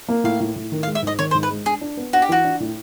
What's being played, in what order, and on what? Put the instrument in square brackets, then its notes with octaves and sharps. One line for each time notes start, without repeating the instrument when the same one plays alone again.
[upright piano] A#3
[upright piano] A2 [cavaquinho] F5
[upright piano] A2
A2
D#3
[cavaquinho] F5
[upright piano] G#3
[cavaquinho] E5
[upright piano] G#2 [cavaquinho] D#5
[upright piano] D#3 [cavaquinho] C#5
[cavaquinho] C5
[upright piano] G#2
[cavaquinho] B4
[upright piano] G#3
[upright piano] D4 [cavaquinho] G#4
[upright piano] D4
B3
[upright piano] D4 [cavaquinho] F#4
[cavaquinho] G4
[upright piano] E3 [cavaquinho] F#4
[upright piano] D4
A2